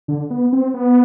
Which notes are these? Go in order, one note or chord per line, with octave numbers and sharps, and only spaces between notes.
D3
B3
C4
B3